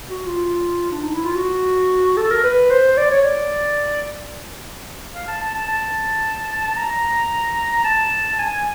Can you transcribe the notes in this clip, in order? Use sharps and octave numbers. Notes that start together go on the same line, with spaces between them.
F#4
F4
D4
D#4
E4
F4
F#4
A4
A#4
B4
C5
D5
C#5
D5
F5
A5
A5
A5
A5
A#5
A5
G#5